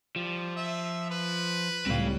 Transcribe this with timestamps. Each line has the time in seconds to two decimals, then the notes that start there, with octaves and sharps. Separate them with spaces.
0.16 F3 G3
0.56 E5
1.11 B4
1.86 C#2 A2 G3 C4 F5